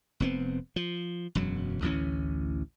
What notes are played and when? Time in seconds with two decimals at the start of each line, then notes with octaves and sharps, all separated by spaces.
0.20 F1 B3 C4
0.76 F3
1.35 E1 F#2 F#3
1.82 A1 D2 E3 C#4